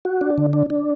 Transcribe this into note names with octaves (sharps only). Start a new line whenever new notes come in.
F#4
D4
D3
D4
D4